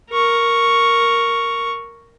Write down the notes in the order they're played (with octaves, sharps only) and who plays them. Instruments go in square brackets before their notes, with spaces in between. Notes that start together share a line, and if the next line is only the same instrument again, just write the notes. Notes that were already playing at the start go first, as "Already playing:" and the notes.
[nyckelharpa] A#4 C#6